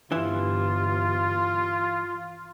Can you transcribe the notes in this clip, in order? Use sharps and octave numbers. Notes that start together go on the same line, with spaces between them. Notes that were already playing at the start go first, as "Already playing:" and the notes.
G1 G2 E3 E4 F4